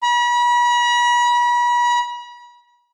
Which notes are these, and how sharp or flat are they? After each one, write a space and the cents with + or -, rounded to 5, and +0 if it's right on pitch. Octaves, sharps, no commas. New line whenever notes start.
B5 -40